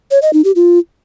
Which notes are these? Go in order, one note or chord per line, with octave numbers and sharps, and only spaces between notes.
C#5
D#5
D#4
G4
F4